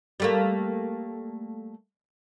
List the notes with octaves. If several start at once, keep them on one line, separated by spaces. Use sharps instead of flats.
G3 A3 A#3